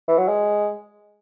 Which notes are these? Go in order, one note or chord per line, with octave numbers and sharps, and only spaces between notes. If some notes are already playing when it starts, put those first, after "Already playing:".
E3
F#3
G#3